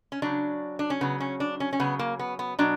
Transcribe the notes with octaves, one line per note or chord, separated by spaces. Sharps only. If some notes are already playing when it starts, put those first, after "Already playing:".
C#4
C#3 F#3 D4
D4
C#4
C#3 F#3 B3
C#4
D4
C#4
C#4
C#3 F#3 B3
A#3
B3
B3
B2 F#3 D4